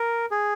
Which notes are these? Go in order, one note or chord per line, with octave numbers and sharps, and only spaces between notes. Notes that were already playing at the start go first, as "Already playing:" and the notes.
Already playing: A#4
G#4